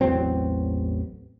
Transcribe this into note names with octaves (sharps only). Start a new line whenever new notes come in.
A1 E2 F#3 C4